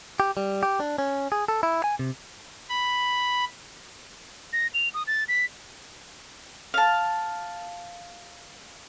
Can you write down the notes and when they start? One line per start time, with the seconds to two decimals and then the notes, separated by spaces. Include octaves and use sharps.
0.20 G4
0.37 G3
0.63 G4
0.80 D4
0.98 C#4
1.32 G#4
1.48 A4
1.63 E4
1.84 G#5
1.99 C3
2.69 B5
4.53 A#6
4.74 F7
4.94 D#6
5.07 A6
5.28 B6
6.74 F5 A5